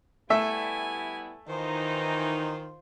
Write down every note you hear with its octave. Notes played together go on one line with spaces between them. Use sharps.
G3 A3 B3 E4 E5 G#5
D#3 E3 D#4 F4 C5